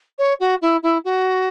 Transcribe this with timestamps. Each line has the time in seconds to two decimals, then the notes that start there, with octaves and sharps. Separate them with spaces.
0.18 C#5
0.40 F#4
0.61 E4
0.83 E4
1.04 F#4